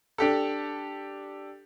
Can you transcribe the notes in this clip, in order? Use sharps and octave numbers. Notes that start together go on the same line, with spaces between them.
D4 G4 A4